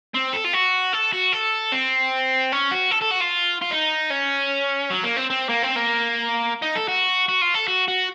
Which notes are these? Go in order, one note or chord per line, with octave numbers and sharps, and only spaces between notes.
C4
A4
F4
F#4
A4
F#4
A4
C4
C#4
F#4
A4
A4
F#4
F4
F4
D#4
C#4
F#3
A#3
C4
C4
A#3
C4
A#3
D#4
A4
F#4
F#4
F4
A4
F#4
F#4